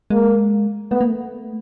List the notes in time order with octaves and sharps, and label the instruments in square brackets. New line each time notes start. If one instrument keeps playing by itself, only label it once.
[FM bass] G#3 [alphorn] A#3
[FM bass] A3 [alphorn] B3
[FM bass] A#3
A3